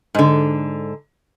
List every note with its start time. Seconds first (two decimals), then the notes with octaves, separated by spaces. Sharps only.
0.15 G#2 D3